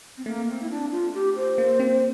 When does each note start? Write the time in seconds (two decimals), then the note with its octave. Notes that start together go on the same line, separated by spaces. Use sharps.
0.17 C4
0.26 A3 A#3
0.48 C4
0.62 E4
0.70 D4
0.91 F4
1.14 G4
1.36 C5
1.58 A#3
1.80 C4